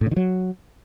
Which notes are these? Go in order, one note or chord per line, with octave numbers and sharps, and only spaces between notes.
A2
C#3
D#3
F#3